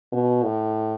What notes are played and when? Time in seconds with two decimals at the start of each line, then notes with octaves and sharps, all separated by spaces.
0.12 B2
0.43 A2